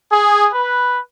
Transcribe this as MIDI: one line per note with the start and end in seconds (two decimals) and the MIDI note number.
0.12 0.48 68
0.54 1.00 71